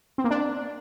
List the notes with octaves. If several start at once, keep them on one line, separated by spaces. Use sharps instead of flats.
C4
A#3
D4